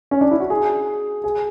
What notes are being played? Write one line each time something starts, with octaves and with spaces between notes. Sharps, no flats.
C#4
D4
E4
F#4
G#4
G#4